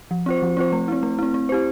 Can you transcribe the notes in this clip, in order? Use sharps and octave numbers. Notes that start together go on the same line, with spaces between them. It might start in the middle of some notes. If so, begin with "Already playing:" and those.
F3
C4 F4 C5
F3
C4 F4 C5
A3
C4 E4
A3
C4 E4
C4
E4 G4 C5